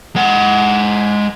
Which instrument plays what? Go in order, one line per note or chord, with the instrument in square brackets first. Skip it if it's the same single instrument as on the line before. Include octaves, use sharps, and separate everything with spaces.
[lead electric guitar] G#3 F#5